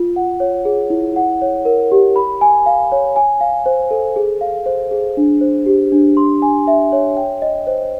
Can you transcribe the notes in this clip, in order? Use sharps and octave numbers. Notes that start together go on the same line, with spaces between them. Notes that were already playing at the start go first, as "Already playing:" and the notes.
Already playing: F4
F#5
C#5
G#4
E4
F#5
C#5
A#4
G4
B5
G#5
F5
C#5
G#5
F5
C5
A4
G#4
F5
C5
G#4
D4
C5
G4
D4
C6
G#5
E5
C#5
G5
D#5
C5